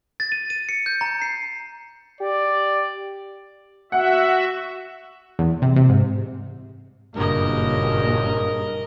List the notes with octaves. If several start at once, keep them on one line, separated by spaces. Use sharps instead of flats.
A6
D#7
D#7
C#7
G6
A#5
C7
G4 D5
F#4 E5 F#5
E2
C3
C3
G#2
F#1 G2 A#2 C#3 A#4 D#5